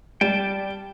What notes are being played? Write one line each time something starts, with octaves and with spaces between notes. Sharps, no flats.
G3 G5 A5